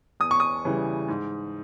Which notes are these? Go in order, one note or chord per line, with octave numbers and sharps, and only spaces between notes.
E2 D#6
C#6
D#6
C#3 E3 G3
G#2